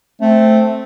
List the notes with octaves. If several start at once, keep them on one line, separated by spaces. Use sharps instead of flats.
A3 C4